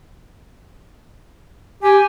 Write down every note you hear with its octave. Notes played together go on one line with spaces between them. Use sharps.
G4 G#5